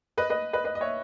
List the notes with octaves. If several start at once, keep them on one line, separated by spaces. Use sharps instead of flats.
B4 D#5
B4 D#5
B4 D#5
B4 D#5
D#5
C#5 E5